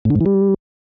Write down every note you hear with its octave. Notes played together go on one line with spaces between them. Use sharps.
A2
D3
G#2
E3
G3